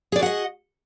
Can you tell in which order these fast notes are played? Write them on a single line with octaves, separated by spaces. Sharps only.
G#4 D5 F#4 F#5 D#5